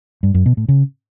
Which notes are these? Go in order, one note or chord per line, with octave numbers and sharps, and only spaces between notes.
G2
F#2
B2
A2
C#3